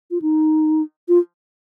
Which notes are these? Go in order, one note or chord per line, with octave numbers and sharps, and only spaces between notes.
F4
D#4
F4